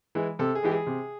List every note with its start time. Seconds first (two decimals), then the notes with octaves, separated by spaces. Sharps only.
0.15 E3 G#3
0.39 C3 A4
0.55 G#4
0.63 E3 G#3 G4
0.71 G#4
0.87 C3